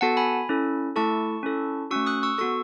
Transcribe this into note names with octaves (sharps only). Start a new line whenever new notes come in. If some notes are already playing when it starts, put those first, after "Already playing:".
B3 F#4 A4 F#5 A5
G#5 B5
C#4 E4 A4
A3 E4 A4 A5 C#6
C#4 E4 A4
A3 C#4 F#4 C#6 E6
D#6 F#6
C#6 E6
B3 F#4 A4 C#6 E6